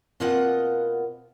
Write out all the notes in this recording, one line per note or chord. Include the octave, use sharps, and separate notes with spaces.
B2 A#3 C4 F4 D#5 F#5